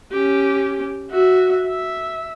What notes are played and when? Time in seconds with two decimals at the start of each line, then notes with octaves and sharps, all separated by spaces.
0.12 C#4 G4
1.10 F#4 E5
1.67 E5